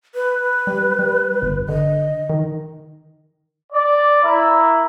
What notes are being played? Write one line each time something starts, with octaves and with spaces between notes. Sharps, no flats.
B4
G3
G3
G1
D3 D#5
D#3
D5
A#3 E4